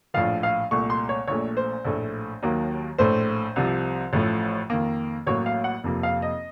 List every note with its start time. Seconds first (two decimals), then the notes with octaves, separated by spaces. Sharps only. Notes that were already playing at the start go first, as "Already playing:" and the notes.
0.14 A#1 A2 F3 F5
0.43 F5
0.71 C2 A#2 A3 C#6
0.90 C6
1.09 C#5
1.27 A#1 A#2 A3 C#5
1.57 C5
1.85 A#1 A2 A3
2.43 D#2 D#3 F#3 A#3
2.98 A#1 A2 A3 C5
3.56 C2 C3 F3
4.13 A1 A2 F3 A3
4.70 F2 D#3 A#3
5.27 A1 A2 F#3 A#3 C#5
5.46 F5
5.64 F#5
5.83 F1 F2 C3 F3 A#3
6.03 F5
6.22 D#5